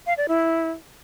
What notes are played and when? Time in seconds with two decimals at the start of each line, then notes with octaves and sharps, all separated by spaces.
0.07 F5
0.18 D5
0.28 E4